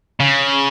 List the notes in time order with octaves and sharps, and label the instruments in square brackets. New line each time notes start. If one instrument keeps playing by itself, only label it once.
[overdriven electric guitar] C#3